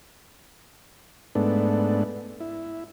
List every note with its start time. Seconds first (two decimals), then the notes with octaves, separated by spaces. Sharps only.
1.35 G#2 A3 B3 D4
2.40 E4